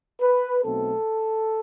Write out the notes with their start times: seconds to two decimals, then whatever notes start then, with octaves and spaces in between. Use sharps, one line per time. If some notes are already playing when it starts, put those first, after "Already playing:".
0.21 B4
0.64 B1 B2 A3 C4 A4